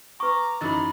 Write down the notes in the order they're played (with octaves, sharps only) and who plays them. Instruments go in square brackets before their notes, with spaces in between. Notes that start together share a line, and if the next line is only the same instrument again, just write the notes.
[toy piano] B4 C#6 [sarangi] A#5 [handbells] D6
[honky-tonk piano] F#2 E3 D#4 [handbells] B5 A6